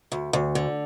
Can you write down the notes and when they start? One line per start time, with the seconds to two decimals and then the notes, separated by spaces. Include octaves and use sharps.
0.12 D2
0.33 D2
0.55 D3